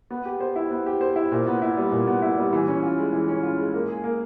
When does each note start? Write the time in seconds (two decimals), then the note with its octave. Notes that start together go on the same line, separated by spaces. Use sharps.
0.10 B3
0.25 G4
0.40 C5
0.56 E4
0.71 B3
0.86 G4
1.01 C5
1.16 E4
1.32 A#2
1.47 B3
1.62 E4
1.77 G3
1.92 A#2
2.07 B3
2.22 E4
2.38 G3
2.53 E3
2.68 C#4
2.83 F4
2.98 G#3
3.13 E3
3.28 C#4
3.43 F4
3.58 G#3
3.74 A#3
3.89 G#4
4.04 A#3